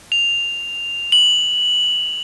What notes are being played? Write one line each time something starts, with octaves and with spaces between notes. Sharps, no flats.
F7
F#7